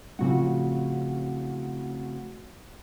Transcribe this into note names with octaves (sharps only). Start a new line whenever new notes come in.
A2 C#3 F3 C4 F#4 F#5